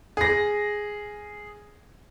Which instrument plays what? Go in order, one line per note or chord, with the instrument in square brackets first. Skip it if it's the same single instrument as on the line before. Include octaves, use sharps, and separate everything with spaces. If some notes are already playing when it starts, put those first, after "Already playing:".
[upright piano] G#4 A#6